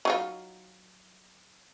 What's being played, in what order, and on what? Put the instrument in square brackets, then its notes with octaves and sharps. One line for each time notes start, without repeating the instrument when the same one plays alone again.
[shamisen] F#3 D#4 F4